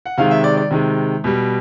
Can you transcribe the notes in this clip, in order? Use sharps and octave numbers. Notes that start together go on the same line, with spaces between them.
F#5
C3 D#3 G#3 F5
E5
D5
D5
C3 D#3 G#3
B2 G3